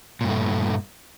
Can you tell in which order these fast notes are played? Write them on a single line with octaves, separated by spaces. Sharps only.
A#2 G2 A3